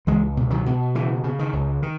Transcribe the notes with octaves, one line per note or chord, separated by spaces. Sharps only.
C#2 E3 G#3
B2
D#3 F#3
B2
C#3 E3
C#3
D#3
C#2
D#3